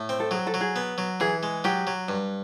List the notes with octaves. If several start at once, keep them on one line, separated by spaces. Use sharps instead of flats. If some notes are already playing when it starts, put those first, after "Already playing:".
Already playing: A2
C4
A4
F#3 G#4
A4
F#3
G#4
B3
F#3
E3 G#4
G#3
F#3 G4
F#3
G2